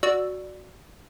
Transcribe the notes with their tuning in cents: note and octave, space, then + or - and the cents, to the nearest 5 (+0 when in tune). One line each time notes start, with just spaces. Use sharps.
F#4 +0 D5 +0 E6 +0